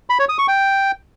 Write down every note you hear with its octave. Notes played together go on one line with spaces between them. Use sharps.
B5
C#5
D#6
C#6
G5